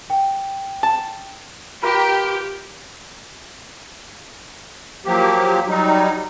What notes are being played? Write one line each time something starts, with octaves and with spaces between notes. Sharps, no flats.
G5
A5
F4 G4 A#4 B4
F3 F#3 A#3 G4
F#3 G3 D#4